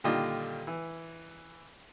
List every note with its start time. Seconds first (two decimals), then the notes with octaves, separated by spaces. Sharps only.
0.04 A#2 D3 D#3 G3 F4 D#5
0.67 E3